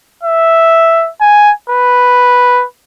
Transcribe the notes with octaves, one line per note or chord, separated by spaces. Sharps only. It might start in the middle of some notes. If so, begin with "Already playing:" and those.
E5
G#5
B4